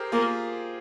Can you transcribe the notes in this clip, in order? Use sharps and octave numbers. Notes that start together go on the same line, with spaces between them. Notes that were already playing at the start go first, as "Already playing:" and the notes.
Already playing: G4 G#4 A#4 C5
A#3 F4 G#4